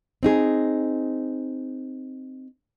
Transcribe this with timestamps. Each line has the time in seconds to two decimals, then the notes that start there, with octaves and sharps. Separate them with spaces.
0.23 C4 D#4 G#4